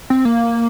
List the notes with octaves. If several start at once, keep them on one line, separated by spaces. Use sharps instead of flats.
C4
A#3